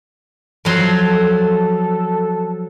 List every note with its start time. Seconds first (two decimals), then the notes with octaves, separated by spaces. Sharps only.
0.65 F3 F#3 A4 C6